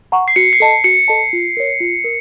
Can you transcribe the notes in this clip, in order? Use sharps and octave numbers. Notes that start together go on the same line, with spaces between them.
F#5 A#5 C#6
C7
F#4 C#7
C7
A4 D#5 A5
F#4 C#7
A4 D#5 A5
F4
A#4 C#5
F4
A#4